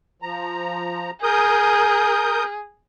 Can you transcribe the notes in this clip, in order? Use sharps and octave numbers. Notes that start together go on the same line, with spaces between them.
F3 A#5
G#4 A#4 D#6 G6